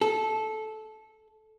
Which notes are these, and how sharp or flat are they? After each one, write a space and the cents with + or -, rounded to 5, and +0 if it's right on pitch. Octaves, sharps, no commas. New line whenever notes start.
A4 -15